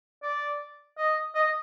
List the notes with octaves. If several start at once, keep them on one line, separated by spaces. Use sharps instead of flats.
D5
D#5
D#5